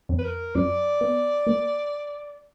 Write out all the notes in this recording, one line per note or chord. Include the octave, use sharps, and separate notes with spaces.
F2
B4
A#4
F#2 D5
B3
A#3